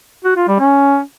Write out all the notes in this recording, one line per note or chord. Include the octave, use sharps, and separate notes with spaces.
F#4
F4
G3
C#4